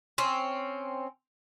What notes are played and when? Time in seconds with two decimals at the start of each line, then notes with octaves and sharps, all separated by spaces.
0.18 C4 C#4